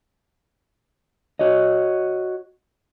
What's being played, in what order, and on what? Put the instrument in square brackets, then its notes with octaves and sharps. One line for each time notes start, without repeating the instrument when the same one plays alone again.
[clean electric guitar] F#4 C#5 D#5